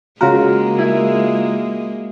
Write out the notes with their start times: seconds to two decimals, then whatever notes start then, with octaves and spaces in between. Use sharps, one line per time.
0.21 C#3 G#3 A#3 F4 F#4 A#4
0.78 E4